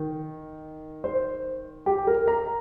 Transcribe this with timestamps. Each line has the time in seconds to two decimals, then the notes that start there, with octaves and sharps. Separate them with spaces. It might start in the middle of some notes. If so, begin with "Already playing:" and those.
Already playing: D#3
1.04 C5
1.86 G4
2.07 A#4
2.28 A#5